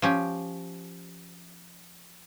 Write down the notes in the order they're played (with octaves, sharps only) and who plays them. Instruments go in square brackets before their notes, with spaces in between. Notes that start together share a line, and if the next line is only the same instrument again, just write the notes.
[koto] F3 C#4 G4